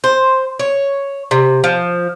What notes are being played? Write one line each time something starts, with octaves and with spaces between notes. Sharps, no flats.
C5
C#5
C3
F3